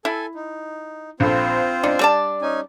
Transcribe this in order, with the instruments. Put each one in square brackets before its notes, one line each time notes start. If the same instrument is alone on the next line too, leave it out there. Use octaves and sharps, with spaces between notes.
[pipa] E4 [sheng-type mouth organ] A4 G#5
[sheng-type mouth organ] D#4
[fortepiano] A#1 A4 [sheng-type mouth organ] C4 F4 C5
[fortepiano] D4 [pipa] D#4
[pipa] G3 D5 A5
[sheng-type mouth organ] C#4 D#4 G#5